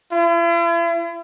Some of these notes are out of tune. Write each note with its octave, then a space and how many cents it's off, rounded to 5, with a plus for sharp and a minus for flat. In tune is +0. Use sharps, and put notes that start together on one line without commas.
E4 +45